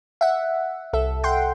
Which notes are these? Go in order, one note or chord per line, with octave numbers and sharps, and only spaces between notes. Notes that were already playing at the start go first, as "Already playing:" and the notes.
E5 F#5
C2 A4 E5
F#5 G5 C6